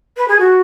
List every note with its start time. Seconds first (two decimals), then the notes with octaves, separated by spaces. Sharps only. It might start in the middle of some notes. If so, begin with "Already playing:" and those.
0.17 B4
0.28 G#4
0.39 F#4